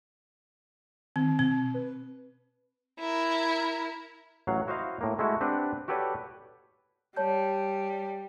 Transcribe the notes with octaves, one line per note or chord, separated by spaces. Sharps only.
D#3 C4
B2 C4
B4
E4 A#4
A1 F#3 F5 F#5
E4 F#4 C5 D#5 F5
A2 A#3
G#3 A3 E4 F#4
C4 D4 G4 B4 D5 F#5
F#4 G4 A4 B4 C#5 D5
G3 C#5 A5 G6